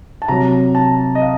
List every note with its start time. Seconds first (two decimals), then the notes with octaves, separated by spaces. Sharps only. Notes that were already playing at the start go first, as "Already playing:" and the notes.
0.22 A5
0.28 C3 F#3 A#5
0.75 A5
1.15 D#5
1.22 F5